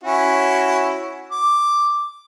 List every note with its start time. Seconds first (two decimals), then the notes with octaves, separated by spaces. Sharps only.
0.03 C#4 E4 F#4
1.32 D6